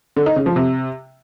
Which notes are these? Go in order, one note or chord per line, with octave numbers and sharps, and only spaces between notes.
D3
D#4
C#3
F3
C3